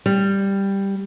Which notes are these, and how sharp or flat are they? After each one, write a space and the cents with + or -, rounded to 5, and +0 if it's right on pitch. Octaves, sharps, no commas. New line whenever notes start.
G3 +5